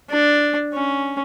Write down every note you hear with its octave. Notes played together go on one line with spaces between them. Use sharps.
D4
C#4